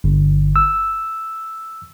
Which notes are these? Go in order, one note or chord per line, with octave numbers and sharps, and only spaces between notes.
G1
E6